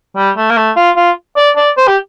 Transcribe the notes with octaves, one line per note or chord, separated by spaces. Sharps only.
G3
A3
A#3
A3
F4
F4
D5
D5
C5
G4